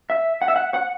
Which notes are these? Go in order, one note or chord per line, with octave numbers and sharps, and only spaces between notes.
E5
F#5
E5
F#5
F#5